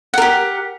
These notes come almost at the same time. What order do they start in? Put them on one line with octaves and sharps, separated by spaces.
F#5 A#4 G4